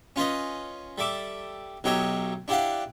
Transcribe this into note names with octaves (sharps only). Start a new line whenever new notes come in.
C#4 F4 B4 D#5
G3 A4 E5 D6
B1 F#3 D#4 G4 C#5 E5
D4 E4 G4 F5 F#5